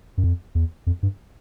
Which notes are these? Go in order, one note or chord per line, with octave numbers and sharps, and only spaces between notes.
F#2
F2
E2
F2
G2